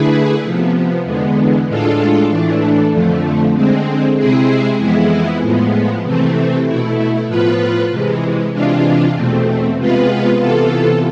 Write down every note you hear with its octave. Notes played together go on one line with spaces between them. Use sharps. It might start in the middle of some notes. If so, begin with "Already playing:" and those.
Already playing: D3 A3 E4 G#4 B4
C3 F3 B3
E2 D3 G#3 B3
A2 G#3 D4 F4 A4
A2 E3 A3 D4
F2 D3 F3 A3
D3 G#3 C4
C3 G#3 C4 E4 G#4
F2 E3 G#3 B3 E4
A2 F3 G#3 B3
C3 E3 A3 C4
B2 A3 E4
A2 F3 B3 F4 B4
C3 E3 G#3
C3 E3 G#3 D4 F4
E2 B2 A3 C4
C3 G#3 B3 F4 B4
C3 E3 B3 F4 A4